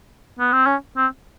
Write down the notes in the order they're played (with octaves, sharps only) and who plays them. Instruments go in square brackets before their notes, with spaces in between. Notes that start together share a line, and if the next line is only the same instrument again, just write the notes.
[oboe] B3
C4
C#4
C4